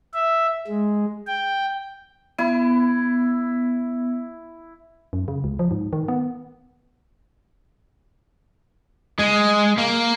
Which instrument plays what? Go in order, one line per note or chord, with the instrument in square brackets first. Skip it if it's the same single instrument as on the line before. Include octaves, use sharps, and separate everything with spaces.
[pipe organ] E5
G#3
G5
[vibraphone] B3 [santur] E4
[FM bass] F#2
C#3
C#2
F3
G#2
D#3
B3
[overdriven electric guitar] G#3
A#3